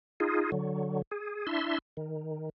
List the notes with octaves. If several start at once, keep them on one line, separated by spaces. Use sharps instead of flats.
D#4 F4 G#4
D3 F#3
G#4
D4 E4 E5 C6
D#3